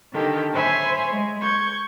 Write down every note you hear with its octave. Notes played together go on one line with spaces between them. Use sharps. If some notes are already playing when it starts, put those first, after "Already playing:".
D3 D#3 G4 A4
C5 C#5 E5 G#5 B5 C6
G#3
C#6 G6 G#6